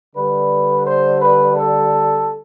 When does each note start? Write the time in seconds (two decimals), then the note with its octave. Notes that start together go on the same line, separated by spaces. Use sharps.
0.16 D3 G3 B4
0.86 C5
1.21 B4
1.56 A4